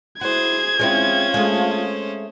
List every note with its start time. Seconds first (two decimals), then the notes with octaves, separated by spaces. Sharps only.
0.21 G#3 E4 F#4 G#4 C5 G#6
0.79 G#3 C4 C#4 E4 F4 C5
1.34 G#3 A3